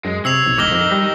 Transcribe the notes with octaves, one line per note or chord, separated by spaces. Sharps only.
F#2 G#3
C3 C#5 E6 C7 F7
B1
E1 D#4 A#4 D6 A#6 G7
F2
G3